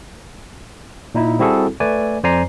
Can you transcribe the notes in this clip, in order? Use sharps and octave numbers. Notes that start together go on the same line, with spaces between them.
A#2 D#4 E4
G3 C4 E4 F#4 G#4 A4
A3 B4 D5 G#5
F2 C5 D5 G#5 A#5 C7